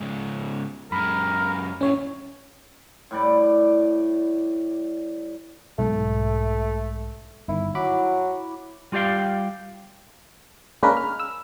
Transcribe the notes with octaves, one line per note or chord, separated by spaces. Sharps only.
G#2 C#3
F#2 G#3 A#4 B5
D#2 A2 C#4 C#5
A2 G3 D5
B1 G#2 A3
G1 D#3 E4
F#3 E4 B5 D6
G3 F4 G4 D5 F5 G5
G#3 A#3 C#4 D4 A#4 B4
F6
E6